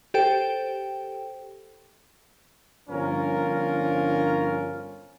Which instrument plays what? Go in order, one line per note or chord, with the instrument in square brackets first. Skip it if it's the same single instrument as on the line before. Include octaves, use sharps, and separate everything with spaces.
[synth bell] G4 A4 C5 G5
[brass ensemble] G1 G2 F3 C#4 F4 A#4